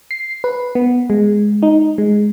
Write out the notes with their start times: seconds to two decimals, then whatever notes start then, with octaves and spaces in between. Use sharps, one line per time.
0.11 C7
0.44 B4
0.75 B3
1.10 G#3
1.62 D#4
1.98 G#3